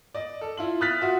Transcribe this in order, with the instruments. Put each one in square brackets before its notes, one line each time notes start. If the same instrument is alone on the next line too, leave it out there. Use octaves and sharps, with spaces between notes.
[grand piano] D5 D#5
A4
E4 F4 F#7
D#6 F6 F#6 A6 B6
F4 F#4 E5